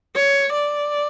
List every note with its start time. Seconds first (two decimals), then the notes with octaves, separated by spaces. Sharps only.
0.16 C#5
0.53 D5